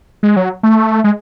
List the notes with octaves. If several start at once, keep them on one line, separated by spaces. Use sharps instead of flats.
G#3
F#3
A3
G#3